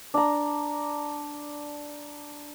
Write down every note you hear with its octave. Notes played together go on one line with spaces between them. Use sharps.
D4 A#5